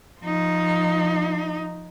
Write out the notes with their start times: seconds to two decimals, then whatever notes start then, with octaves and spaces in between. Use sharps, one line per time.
0.21 F3 D#4